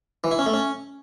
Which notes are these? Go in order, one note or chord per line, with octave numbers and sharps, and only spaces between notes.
E3
E4
C#4
A3
C#4